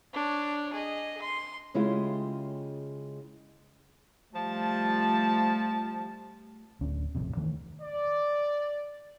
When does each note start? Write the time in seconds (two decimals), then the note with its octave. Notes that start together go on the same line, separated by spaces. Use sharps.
0.13 D4 C#5
0.73 G#4 D#5
1.22 C6
1.74 C#3 G#3 E4 F4 G4
4.35 F3 G3 A3 A5
6.81 D1 D2 C#4
7.15 D#1 A1 F2 C3
7.37 D#3 E3 A3
7.81 D5